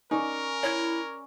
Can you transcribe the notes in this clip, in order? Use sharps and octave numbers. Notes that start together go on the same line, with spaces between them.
C#4 D#4 A#4 D5
E4 C#5